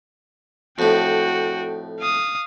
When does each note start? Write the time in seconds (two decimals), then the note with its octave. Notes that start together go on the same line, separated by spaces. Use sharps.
0.79 F2 A2 F#4 G5
2.00 F5 D#6